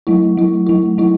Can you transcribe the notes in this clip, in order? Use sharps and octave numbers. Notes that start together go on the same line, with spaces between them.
F#3 A3 E4
F#3 A3 E4
F#3 A3 E4
F#3 A3 E4